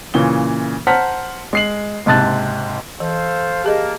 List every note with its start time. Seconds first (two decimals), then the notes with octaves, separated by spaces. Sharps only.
0.14 A#2 C#3 E3 F4 G7
0.87 C5 F#5 A5 A#5 F6 B6
1.53 G#3 C7 F#7
2.06 F#1 G#2 C3 A5 F#6 A6
3.00 E3 A3 A4 C5 F5
3.64 A#3 G4 G#4 D#5 A5